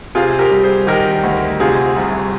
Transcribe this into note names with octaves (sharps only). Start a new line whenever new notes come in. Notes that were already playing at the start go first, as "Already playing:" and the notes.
C3 F4 G#4
G4 A#4
G3
G#4 C5
D#3 G4 A#4
D2
C3 F4 G#4
C2